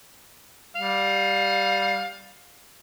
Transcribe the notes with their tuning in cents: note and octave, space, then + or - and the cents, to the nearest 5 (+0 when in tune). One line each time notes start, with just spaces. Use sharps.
G3 +0 F5 +20